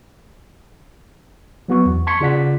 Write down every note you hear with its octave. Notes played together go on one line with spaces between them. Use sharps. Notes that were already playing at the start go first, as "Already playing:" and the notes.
F#3 B3 F#4 C#6
E2
A5 C6 C#6 G#6 B6 C#7
C#3 F4 D5 F#5 B6